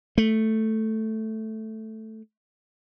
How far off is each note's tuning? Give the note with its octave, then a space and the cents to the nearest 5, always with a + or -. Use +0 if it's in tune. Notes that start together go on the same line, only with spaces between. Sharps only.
A3 +0